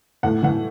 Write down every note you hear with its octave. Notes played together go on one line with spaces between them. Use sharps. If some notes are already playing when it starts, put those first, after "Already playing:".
A2 F#5
E3 F#5